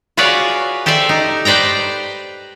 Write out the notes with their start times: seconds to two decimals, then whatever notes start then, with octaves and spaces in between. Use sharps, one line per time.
0.17 F4 F#4 G#4 B4 C#5 D5
0.86 G4 A4 C5 D5 E5
1.09 D#4
1.45 B4 C5 D5 G5 A#5